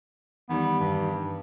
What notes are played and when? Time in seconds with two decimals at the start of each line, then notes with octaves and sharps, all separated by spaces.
0.49 E2 D#3 G3 B3
0.80 G2